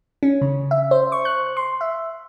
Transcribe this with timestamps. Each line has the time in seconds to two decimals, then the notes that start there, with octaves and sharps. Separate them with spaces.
0.23 C#4
0.41 C#3
0.71 E5
0.91 C5
1.12 C#6
1.25 F#6
1.57 C6
1.81 E5